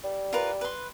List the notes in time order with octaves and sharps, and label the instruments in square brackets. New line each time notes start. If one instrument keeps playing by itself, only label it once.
[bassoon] G3
[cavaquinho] F4 A#4 B4
B4 C6